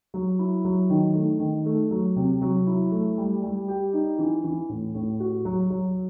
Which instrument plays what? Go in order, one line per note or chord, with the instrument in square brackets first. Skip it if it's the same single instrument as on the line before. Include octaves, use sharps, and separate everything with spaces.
[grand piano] F#3
E4
F#3
D#3
A3
D#3
A3
F#3
C3
F#3
E4
A3
G3
G3
G4
D#4
E3
E3
A2
A2
F#4
F#3
F#3